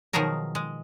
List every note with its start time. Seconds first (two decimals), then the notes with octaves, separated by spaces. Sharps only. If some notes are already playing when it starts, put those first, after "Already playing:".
0.13 B2 D#3 F3 F#3 G#4 A#4
0.55 G#3